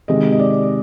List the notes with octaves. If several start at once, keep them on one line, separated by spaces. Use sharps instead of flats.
C3 D#3 G#3 D#5
D#5
D5